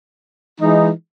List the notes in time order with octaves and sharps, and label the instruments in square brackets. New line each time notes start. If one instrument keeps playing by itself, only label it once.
[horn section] E3 G#3 D#4